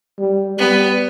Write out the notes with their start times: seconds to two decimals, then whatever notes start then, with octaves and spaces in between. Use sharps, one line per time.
0.18 G3
0.58 G3 B3